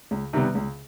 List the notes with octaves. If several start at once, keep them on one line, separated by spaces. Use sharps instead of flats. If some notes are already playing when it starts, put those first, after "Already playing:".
C#2
C3 D#3 G3 B3
C#2